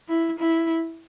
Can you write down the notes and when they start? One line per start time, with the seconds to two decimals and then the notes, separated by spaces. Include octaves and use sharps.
0.08 E4
0.39 E4